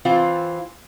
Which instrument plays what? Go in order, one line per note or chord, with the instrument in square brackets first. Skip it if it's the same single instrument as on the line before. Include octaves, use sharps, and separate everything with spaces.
[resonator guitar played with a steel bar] E3 C4 F4